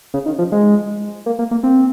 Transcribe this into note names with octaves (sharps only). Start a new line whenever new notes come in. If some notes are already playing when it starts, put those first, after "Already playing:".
C#3
D#3
F3
G#3
A#3
A#3
A#3
C4